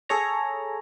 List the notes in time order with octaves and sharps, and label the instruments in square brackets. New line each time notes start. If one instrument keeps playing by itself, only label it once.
[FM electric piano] G#4 A4 C#5 A#5